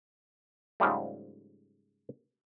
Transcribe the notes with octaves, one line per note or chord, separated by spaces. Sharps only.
G#2 C#3 F3 G3 A3